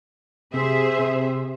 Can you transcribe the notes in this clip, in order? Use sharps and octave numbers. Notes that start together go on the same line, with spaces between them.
C3 G#4 C5 E5
C3